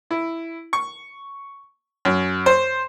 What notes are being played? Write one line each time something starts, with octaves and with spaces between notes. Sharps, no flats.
E4
C#6
F#2
C5